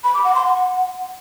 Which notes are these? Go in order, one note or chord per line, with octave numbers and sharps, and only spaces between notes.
B5
D6
F#5
C6
F#5